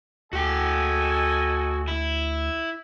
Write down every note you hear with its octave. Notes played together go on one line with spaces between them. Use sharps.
D2 F#4 A4 D#5 G5 G#5
E4